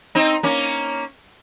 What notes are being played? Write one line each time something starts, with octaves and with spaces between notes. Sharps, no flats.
C4 D#4
A#3 C#4